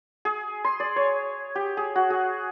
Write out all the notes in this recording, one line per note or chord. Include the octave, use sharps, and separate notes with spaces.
G#4
C6
D5
C#5
G4
G#4
F#4
G#4